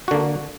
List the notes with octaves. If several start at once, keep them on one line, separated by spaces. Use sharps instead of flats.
D3 A#3 F#4